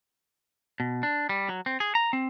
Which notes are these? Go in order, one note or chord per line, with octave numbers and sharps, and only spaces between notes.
B2
D4
G3
F#3
C4
G#4
A#5
C4